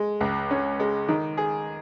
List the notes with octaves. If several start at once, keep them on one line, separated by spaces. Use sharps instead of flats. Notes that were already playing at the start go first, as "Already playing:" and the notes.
Already playing: G#3
C#2
C#4
G#3
D#3
G#4